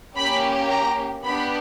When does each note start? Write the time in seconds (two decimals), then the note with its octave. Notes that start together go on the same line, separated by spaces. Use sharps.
0.17 A#3 C#4 G4 B5
0.70 A#5
1.23 B3 D4 G4 B5